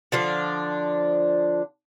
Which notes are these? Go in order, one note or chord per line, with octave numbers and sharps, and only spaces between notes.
D3 F3 D4